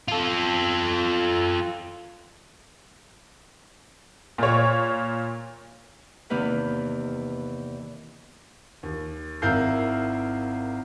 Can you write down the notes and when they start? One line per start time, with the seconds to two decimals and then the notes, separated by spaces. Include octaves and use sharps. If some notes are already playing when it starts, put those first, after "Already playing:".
0.08 F4 A4
4.38 A#2 C#5
6.30 E2 C3 D#3 A#3 B4 G5
8.83 D#2
9.42 G#1 E4 A#4 F5 G6 C7